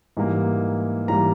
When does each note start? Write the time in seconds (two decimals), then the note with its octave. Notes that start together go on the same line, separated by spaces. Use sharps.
0.17 G#2 E3 G3 A#3
1.08 G#2 E3 G3 A#3 A#5